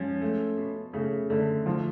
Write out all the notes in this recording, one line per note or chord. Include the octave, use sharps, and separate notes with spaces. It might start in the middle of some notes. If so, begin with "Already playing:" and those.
Already playing: F3 G#3 C#4
A3
B2
C#3 A3
D3 A3
D2 F3